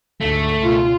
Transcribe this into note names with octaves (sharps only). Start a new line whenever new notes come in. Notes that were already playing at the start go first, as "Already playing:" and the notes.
D2 G#2 A3
C#2 B2 F4